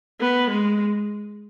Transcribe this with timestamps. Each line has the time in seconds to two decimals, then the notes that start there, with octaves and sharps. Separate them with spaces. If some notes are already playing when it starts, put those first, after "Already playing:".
0.21 B3
0.50 G#3